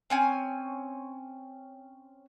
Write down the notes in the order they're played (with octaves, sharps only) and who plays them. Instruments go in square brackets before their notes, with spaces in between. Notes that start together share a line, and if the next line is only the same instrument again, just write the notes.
[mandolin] C4 C#4 G#5